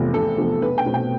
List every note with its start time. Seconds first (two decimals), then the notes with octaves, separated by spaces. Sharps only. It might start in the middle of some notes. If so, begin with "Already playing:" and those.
Already playing: F1 E2 C3 F3
0.14 F1 A4
0.38 E2 C3 F3
0.62 B1 B4
0.78 G5
0.86 B2 A3 C4
0.94 G5